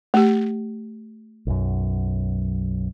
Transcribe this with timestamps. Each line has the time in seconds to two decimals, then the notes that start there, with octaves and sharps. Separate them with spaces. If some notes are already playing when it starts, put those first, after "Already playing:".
0.14 A3 G4
1.47 B1 F#2